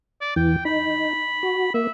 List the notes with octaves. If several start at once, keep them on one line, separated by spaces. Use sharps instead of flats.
D5
E2 E3 G5
D#4 B5
F#4
A#3 E5